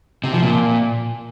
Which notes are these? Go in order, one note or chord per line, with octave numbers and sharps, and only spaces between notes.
C3
F3
A#2